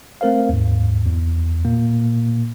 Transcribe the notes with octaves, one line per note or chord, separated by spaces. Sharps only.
A3 C4 A#4 C5 F5
D#2 G#2
E2
A#2 A#3